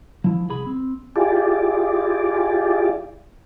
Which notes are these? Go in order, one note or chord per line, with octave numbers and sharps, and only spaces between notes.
F3 E4
C2 G#4 B5
C4
E4 F4 G4 G#4 D5